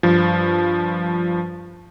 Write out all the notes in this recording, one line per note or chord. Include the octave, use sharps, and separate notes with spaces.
G2 F3